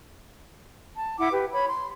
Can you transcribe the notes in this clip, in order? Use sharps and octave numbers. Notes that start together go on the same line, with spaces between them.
A5
E4 F#5 D6
G4 B4
C#5 B5
C6